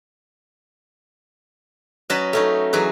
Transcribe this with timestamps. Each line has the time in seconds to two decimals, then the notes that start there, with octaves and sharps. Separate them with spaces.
2.10 F#3 C#4 B4 D#5 A5 B5
2.33 A3 C#4 D#4
2.73 E3 F#3 G#4 B4